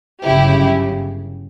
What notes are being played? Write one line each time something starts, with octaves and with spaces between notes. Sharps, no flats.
G1 F#2 C#3 E4 G4